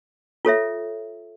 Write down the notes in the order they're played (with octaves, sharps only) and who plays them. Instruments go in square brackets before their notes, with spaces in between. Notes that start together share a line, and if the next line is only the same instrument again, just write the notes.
[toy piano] F4 A4 C#5 E5